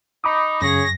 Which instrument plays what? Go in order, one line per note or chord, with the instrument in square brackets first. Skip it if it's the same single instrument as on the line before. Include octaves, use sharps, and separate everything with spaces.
[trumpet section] D#4 [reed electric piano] B5 D6 D#6
[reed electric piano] F#2 [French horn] C#3 [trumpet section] G#4 C#5 [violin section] A#6